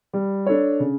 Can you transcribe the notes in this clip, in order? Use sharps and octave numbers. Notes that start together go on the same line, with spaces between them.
G3
D4 A4 C#5
C#3